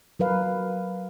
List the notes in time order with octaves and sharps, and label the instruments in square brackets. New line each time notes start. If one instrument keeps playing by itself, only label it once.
[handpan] F#3 A#4 B4 F5